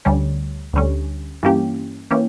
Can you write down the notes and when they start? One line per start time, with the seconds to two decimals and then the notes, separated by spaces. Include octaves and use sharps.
0.05 D2 D3 G3 C#4
0.73 D2 D3 G3 C#4
1.43 G2 E3 A#3 C#4 G4
2.11 E3 A#3 C#4 G4